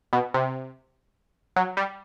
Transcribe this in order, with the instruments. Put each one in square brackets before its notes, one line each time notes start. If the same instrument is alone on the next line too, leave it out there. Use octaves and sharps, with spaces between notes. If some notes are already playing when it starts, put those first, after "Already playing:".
[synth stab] B2
C3
F#3
G3